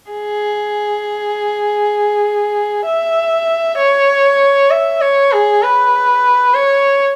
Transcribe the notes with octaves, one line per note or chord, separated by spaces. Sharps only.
G#4
E5
C#5
E5
C#5
G#4
B4
C#5